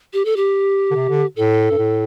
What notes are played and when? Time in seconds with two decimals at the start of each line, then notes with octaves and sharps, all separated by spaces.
0.13 G4
0.25 A4
0.36 G4
0.91 D3
0.95 C3
1.09 D3
1.36 A2 A4
1.71 G2
1.78 A2